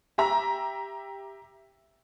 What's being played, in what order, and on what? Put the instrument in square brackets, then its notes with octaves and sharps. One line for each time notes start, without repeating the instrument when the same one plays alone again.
[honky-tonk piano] G4 E5 A#5